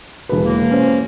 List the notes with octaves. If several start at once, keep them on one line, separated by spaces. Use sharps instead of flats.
E1 B4
F#3 A#3
C#4 C5